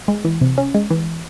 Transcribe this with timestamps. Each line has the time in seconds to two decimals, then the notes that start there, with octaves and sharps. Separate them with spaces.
0.08 G#3
0.25 E3
0.41 C3
0.58 C#4
0.75 G#3
0.90 E3